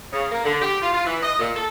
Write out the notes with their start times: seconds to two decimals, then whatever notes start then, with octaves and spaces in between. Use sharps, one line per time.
0.12 C#3
0.31 A#3
0.44 D3
0.62 G4
0.81 F4
0.93 F4
1.05 E3
1.23 D#5
1.39 A#2
1.56 A4